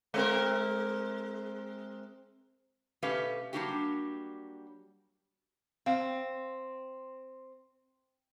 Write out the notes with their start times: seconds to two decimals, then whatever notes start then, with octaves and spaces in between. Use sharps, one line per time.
0.14 G#3 C4 A#4
3.03 B2 A3 C#4 G4 B4 F5
3.53 F#3 G3 A#3 D4 F#4 G4
5.86 C4 F5